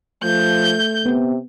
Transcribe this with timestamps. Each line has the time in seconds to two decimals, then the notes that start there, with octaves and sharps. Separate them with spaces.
0.23 F3 A3 G6
1.06 C3 B3